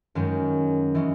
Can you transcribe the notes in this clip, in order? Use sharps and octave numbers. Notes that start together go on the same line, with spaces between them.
F#2 D#3 G#3 C#4
E3 G#3 C#4